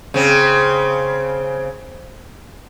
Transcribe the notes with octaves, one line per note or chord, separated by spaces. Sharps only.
C#3 C4